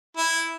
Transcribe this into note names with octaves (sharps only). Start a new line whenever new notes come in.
E4